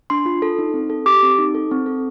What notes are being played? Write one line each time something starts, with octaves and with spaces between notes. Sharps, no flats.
D4 C6
F4
A4
D#4
C4
A4
G4 D6
C4
D#4
A4
C4
A4